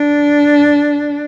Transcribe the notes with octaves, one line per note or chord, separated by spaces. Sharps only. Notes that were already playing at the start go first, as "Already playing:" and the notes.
Already playing: D4